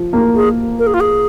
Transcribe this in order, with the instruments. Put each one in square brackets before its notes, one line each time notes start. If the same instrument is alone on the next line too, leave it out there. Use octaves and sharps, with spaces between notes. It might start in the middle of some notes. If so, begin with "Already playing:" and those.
Already playing: [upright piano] F3
A#3
[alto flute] G#4
A#4
G#4
F4
G#4